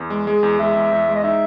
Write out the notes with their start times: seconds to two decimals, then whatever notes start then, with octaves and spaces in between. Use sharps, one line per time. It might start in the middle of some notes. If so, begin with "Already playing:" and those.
Already playing: E2
0.10 G#3
0.27 G#3 G#4
0.43 E2
0.59 G#3 E5
0.75 E2
0.92 E2
1.08 G#3
1.15 D#5
1.24 D#4 E5